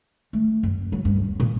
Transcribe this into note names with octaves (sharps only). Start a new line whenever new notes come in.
A3
F#2
F#3
G2
E2
A#2